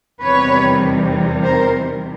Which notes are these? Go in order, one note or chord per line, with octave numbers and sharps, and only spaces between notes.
E2 C3 D#3 G3 B4 C#5
A#4 C5